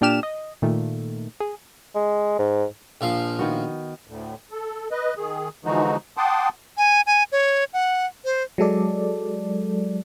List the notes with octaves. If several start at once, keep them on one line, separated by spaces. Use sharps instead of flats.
A#2 D4 G4 F6 E7
D#5
A#2 D#3 A3
G#4
G#3
G#2
A#1 F3 F5
D#3 B3 F#4
D2 A2
A4
B4 D#5
D#3 G#4
D3 E3 F3 G#3 D#4 F#4
F#5 G5 A5 C6 D6 D#6
G#5
G#5
C#5
F#5
C5
F#3 G#3 A4 D5